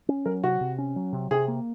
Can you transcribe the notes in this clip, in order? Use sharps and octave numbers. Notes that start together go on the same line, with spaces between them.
C#4
F#3 A#4
C3 F#4
C3
C#4
F#3
C3
C3 G#4
A#3